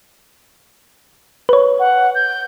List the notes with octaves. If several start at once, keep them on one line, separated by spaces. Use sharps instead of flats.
B4 C#5
F#5
G6